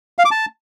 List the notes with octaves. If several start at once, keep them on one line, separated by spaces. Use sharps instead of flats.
F5
D6
A5